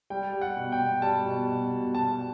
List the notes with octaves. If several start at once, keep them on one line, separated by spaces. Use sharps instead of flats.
G3 G5
G3
F#5
B2
G5
B2
G3 A5
B2
B2
B2
B2 A5
G3